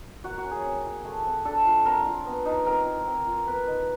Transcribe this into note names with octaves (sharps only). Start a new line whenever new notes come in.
A#3 F#4
F#4
C#4
G#4
C4
E4
A3
C4
D4 A4
F4
C4 A#4
F4
B3
D#4
C4 A#4
E4
C4
F4
B3 B4
D#4